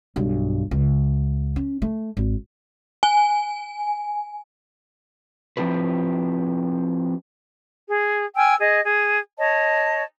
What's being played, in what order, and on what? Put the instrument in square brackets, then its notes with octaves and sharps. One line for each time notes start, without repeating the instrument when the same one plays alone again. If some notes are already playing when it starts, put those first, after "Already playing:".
[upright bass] B1 G2
C#2
C#4
A3
G#1
[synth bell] G#5
[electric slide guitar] F3 C4 E4 G4 B4
[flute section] G#4
G5 G#5 E6 F6
G#4 D#5
G#4
C#5 D#5 A5